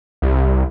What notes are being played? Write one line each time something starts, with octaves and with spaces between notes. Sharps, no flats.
C2